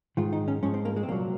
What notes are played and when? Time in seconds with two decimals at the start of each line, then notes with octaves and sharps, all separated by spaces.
0.17 G#2 D#3 G#3 F4
0.33 D#4
0.48 C#4
0.63 G#2 F3 G#3 C#4
0.74 C4
0.85 A#3
0.96 G#3
1.03 C4
1.08 C2 A#2 F#3 A#3